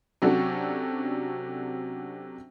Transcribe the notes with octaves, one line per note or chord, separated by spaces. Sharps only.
C3 F#3 C#4 D4 F#4 A4